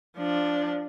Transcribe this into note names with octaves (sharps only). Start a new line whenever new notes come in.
F3 D4